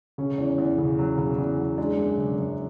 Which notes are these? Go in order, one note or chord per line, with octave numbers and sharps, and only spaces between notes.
C#3 C#4 C#5
E2
E2
C#3
F#3
C#3
E2
F#3
G#3 D4 D5
F#2
C#3
F#2